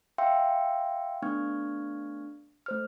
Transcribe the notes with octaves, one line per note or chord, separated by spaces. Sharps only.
E5 F5 G5 C6 E6
A3 B3 D4 C#6 F6 G#6
A3 C5 F6